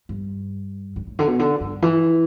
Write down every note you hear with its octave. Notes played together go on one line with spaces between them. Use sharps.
G2
G2
A2
D3
B2
D3
G2
E3